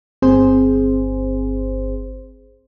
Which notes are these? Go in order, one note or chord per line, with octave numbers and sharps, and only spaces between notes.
G1 C4 G#4 C5